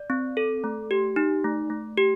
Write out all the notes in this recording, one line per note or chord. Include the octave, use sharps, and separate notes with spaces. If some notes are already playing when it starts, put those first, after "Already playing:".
Already playing: D5
C4
A4
A3
G4
D#4
A3
A3
G4